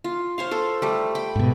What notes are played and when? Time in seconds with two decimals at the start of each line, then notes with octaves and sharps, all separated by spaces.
0.04 F4
0.38 C5 C#5 F5
0.51 A4 C5
0.82 G3 A3
1.15 G5 B5
1.36 G#2 B2